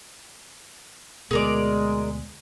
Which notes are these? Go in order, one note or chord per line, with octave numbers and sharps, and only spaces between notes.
D2 B2 G#3 G#4 A#4 D5